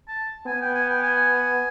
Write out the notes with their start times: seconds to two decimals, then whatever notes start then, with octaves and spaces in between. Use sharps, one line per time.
0.08 A5
0.46 B3 G#5
0.62 G5
0.75 G#5
0.90 G5
1.03 G#5